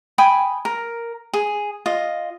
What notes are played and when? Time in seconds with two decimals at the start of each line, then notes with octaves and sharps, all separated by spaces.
0.18 G5 G#5 B5 D#6
0.65 A#4
1.34 G#4
1.86 F4 D#5